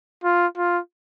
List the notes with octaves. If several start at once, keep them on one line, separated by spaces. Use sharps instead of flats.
F4
F4